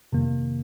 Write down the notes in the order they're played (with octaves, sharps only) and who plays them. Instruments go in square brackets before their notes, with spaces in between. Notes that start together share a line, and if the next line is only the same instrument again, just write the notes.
[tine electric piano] F2 C3 D#3 A#3